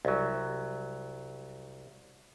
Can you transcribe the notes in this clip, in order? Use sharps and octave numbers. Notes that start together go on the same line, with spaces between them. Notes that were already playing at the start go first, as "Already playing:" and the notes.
C2 F#3